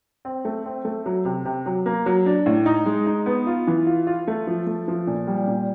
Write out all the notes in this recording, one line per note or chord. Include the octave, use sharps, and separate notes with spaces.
C4
A3
C4
A3
F#3
C3
C3
F#3
A#3
F#3
D4
A2
D#4
G#3
D#4
B3
F4
E3
F4
F4
A3
F3
A3
F3
A#2
G3
A#2